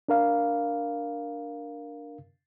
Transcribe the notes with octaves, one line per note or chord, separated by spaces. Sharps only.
D4 A#4 F5